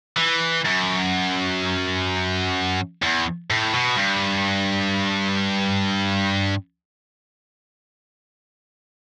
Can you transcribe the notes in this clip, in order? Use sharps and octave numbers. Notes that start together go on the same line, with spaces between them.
E3
F#2
E2
A2
B2
G2